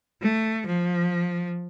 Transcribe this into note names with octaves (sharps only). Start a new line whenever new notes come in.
A3
F3